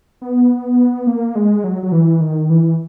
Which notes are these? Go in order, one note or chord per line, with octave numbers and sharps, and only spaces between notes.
B3
A#3
G#3
F#3
F#3
E3
D#3
E3